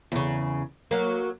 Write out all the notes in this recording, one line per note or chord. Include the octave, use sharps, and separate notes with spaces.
E2 C#3
F#3 A#3